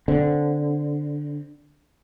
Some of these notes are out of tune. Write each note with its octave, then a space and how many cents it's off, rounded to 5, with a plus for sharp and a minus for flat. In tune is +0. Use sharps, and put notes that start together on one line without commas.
D3 +0 C4 +0